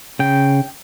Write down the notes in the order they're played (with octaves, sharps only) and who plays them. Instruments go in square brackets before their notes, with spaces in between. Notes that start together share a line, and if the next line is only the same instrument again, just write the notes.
[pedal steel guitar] C#3 G5